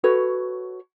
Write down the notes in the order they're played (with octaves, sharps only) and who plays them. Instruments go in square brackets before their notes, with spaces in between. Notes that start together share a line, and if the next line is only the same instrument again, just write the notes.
[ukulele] F#4 A4 B4 C#5